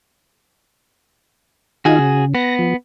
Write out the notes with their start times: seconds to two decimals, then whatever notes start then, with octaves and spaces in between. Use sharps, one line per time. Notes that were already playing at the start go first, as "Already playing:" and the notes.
1.85 D#3 D#4 F4 F#4 G#4
1.99 C#3
2.35 B3 A#6
2.59 F3